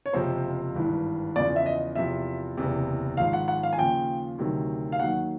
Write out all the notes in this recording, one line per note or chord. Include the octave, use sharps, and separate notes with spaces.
C#5
F#1 F2 C3 F3 C5
G#1 G2 E3
E2 C#3 F3 D5
E5
D#5
E2 C3 F3 E5
F#1 E2 C3
G#1 G#2 F3 F5
F#5
F#5
F5
G#5
D#2 C#3 F3 G5
D2 C3 D#3 F#3
F5
D#2 D#3 F#3 F#5